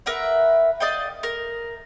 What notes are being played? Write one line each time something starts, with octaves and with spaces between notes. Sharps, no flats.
A#4 B4 E5 F#5
D5 D#5 F5 G5
A#4